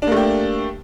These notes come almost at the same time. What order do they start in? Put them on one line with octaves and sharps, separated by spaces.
D4 A#3 A3 G4